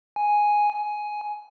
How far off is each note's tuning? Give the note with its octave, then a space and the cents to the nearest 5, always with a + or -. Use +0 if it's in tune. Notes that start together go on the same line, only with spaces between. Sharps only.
G#5 +0
G#5 +10